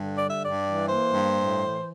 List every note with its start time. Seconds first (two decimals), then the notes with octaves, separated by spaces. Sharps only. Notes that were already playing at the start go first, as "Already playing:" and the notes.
Already playing: G2 D3
0.18 G3 D5
0.30 E5
0.42 G2 D5
0.65 E3
0.88 A#3 C5
1.12 G2
1.36 A2
1.59 E3